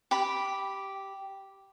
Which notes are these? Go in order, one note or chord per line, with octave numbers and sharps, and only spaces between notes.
G4 B5